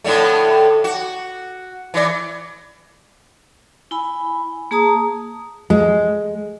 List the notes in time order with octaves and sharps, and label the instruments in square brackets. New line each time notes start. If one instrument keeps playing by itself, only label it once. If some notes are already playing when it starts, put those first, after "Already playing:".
[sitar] A2 D3 A3
F#4
E3 D5
[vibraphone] E4 G#5 B5
A#3 G#4 A5 A#5 D#6
[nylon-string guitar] G#3